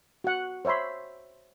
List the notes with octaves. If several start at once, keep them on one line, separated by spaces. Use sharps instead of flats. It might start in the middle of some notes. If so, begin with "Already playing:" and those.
F#4 F#5
C5 C#5 E5 B5 C6